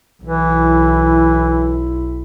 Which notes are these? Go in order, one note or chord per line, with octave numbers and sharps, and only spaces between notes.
B1 E3 E4